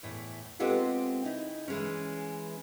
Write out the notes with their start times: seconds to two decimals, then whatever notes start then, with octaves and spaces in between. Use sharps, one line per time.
0.03 E2 A2
0.60 G#3 B3 C4 F4 G4 A4
1.25 C#3 D#4 E4
1.68 E3 G#3 C#4